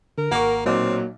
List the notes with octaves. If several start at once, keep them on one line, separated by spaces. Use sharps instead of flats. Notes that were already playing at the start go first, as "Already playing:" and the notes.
D3 A#4
G#1 A#3 F#5 C#6
B1 A#2 F#3 A#3 C4